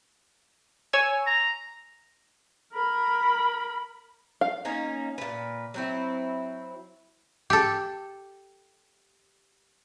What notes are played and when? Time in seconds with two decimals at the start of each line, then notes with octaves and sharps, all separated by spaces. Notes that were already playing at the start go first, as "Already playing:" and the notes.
0.93 C#5 G#5 E6
1.26 A#5
2.73 A#4 B5
4.41 F5
4.65 A#3 C#4 D#4
5.18 A#2 B4
5.74 F#3 C4 E4
7.50 G4 A4